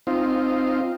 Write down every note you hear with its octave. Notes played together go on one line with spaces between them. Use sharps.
C4 D#4 F4